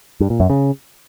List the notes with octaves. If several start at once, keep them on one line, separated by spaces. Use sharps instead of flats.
G2
A#2
F#2
C#3